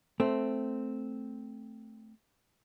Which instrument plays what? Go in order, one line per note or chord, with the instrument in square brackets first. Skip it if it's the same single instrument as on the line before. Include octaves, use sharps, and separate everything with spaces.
[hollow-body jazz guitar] A3 C4